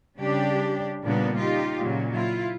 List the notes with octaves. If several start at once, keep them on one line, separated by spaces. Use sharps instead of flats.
C#3 G3 D4 G4
A#2 C#3 G3 A#3 B3 D4
D#4 F4 G4
A#2 C#3 F#3
E4 F4